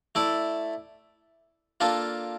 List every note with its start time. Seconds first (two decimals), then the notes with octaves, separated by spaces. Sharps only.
0.15 A3 E4 A4 D5
1.80 A#3 D4 F4 A4